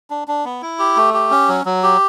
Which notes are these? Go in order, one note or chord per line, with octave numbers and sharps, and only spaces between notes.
D4
D4
B3
E4
G4
A3
G4
C#4
F#3
F#3
G4